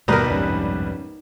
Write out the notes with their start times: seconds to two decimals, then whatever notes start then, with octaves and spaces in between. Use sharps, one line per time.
0.08 G1 D#2 B2 G3 D#4 A#4 B4
0.30 C2 F2 G#2 C#4